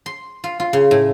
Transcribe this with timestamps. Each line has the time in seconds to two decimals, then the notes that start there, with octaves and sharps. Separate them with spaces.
0.06 C6
0.44 F4
0.60 F4
0.73 C#3
0.91 A2